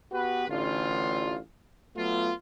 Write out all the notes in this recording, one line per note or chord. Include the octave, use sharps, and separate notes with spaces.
B3 F#4 G4 B4
A1 D3 F4
F#3 A3 B3 F4